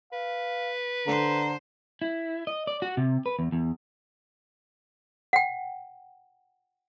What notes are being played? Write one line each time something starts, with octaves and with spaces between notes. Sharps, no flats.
B4 F5
D3 C5 A#5
E4
D#5
D5
F#4
C3
B4
E2
E2
F#5 G5